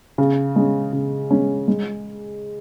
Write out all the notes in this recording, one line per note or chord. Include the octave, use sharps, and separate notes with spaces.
C#3
G#3 C#4
C#3
G#3 C#4
G#3